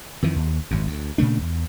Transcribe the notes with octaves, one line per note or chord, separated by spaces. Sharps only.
F2 D#3 E3
D#2
G#1 F#2
D2
A#2 C#3 A3 D4
E2